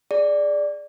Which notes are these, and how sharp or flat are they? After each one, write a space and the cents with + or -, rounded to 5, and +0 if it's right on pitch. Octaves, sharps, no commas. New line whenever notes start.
G#4 +0 D5 +0